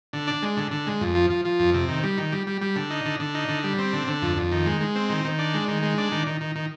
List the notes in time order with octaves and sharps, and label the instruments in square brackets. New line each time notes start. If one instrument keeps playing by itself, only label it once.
[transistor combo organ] D3
D4
G#3
D3
D3
G#3
F2
F3
F3
F3
F2
C3
D#3
G3
D#3
G3
G3
G3
D3
D#4
D3
D3
D#4
D3
G3
C4
D3
D3
F2
F2
D#3
G#3
G#3
C4
D#3
D#3
D4
G#3
D#3
G#3
D4
D#3
D#3
D#3
D#3